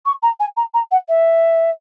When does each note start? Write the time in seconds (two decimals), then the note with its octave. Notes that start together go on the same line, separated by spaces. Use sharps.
0.05 C#6
0.22 A#5
0.40 G#5
0.57 A#5
0.74 A#5
0.91 F#5
1.08 E5